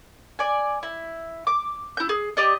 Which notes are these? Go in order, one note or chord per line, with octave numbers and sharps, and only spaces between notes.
D5 G#5
E4
D6
E4 G6
G#4
G4 D5 D#5